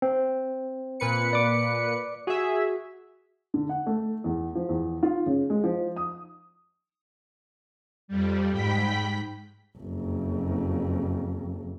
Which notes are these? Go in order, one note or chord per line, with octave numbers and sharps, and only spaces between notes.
C4
A#2 B4 C#7
D5 D6
F#4 G#4 E5
D3
F#5
A3
E2
F3
E2
F4
C#3
G#3
F3
D#6
F2 G3
G#2 G5 B5 B6
F#1 F2